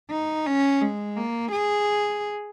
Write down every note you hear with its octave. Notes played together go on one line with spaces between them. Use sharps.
D#4
C#4
G#3
A#3
G#4